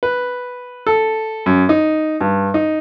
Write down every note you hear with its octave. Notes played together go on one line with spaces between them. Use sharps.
B4
A4
F#2
D#4
G2
D#4